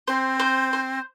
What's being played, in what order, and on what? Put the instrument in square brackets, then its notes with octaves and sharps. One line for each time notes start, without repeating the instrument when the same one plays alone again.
[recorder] C4 [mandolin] C5
[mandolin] C5
C5